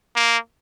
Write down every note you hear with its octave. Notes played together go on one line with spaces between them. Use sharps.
A#3